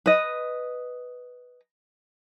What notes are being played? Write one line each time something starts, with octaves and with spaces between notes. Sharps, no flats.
B4 D#5